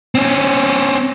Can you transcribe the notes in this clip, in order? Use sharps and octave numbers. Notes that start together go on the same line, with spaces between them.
C4 C#4